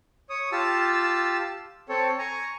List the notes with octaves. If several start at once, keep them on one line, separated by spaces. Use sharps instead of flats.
C#5 D#6
F4 G4 A5 E6
C4 A4 C#5
G#5 A#5 C#6